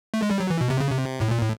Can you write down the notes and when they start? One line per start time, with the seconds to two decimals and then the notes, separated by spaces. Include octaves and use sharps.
0.14 A3
0.22 G#3
0.31 G3
0.40 F#3
0.50 E3
0.61 B2
0.70 C3
0.81 C#3
0.91 C3
1.21 A2
1.31 A#2
1.42 A2